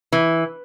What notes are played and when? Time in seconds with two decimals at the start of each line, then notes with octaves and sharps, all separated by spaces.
0.12 E3